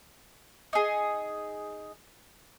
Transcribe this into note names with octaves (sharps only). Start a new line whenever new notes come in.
D#4 G#4